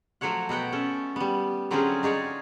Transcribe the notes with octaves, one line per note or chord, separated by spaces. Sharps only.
F3 F#3 A3 C#5 F#5
B2 B3 F#5 G5
C#4 A4
G3 B3
D3 F#3 C4 C#4 F4 G#4
D#4 G#4 C#5 D5